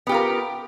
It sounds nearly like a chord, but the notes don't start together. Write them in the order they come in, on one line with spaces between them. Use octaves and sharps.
B3 G4 F4 A#4